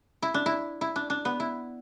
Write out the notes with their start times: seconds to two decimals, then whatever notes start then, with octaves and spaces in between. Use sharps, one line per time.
0.22 E4
0.34 D4
0.46 E4
0.81 E4
0.96 D4
1.10 D4
1.25 B3
1.40 E4